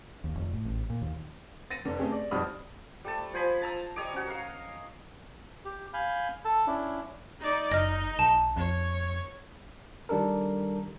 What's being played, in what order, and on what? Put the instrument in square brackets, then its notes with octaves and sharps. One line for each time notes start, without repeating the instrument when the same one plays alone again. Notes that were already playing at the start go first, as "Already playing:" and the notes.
[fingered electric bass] D#2
F1
A2
A1
A#2
D#2
[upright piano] A6 A#6 D#7
F1 D3 D5
A3 C4 C#4 G4 G#4
D5
B1 F2 G3 B5 D#6 F6
[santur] G3 A3 A5
F3 C5 G#5 B5
A5 A#5 E6
G3 C#5 D#5 D6
C#4 F#4
A#4 F5
[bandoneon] G4
F5 G#5 B5 G6
A4 A5
C#4 D4 E4
[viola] D#4 D5
[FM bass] F#1 [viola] D#4 [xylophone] D#5 F6
[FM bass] B1 [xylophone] A5
[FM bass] F2 [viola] C#5
[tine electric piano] D#3 G3 D4 A4 A#4